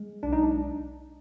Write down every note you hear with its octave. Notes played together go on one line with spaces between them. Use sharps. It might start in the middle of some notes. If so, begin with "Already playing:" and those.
Already playing: G#3
B1 D4
D#4
D4